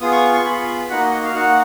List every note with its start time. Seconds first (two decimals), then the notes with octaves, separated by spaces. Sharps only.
0.01 B3 F4 G#4 D#6
0.12 C#6
0.34 C#6
0.45 B3 F4 G#4 B5
0.89 A#3 D#4 F#4 F#5
1.01 D#5
1.24 F5
1.34 A#3 D#4 F#4 F#5